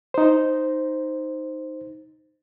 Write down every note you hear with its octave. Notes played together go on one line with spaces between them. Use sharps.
D#4 C5